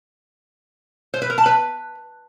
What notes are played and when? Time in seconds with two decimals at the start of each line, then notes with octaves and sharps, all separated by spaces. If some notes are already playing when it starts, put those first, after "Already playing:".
1.14 C5
1.22 B4
1.30 A#4
1.38 A5
1.46 B4